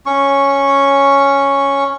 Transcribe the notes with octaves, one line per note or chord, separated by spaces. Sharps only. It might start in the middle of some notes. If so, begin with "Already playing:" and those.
C#4 C#6